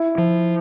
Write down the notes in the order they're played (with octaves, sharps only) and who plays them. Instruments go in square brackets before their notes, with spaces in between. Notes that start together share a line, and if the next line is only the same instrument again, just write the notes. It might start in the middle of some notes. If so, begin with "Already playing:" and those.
Already playing: [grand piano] E4
[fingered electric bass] F3